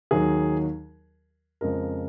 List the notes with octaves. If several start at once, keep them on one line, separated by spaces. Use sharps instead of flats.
D#2 D#3 F#3 G#4
F2 C#3 G#3 A#4